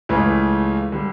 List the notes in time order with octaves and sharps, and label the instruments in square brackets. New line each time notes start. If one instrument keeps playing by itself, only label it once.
[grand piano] C#2 C#3 E3 A3
D3 G3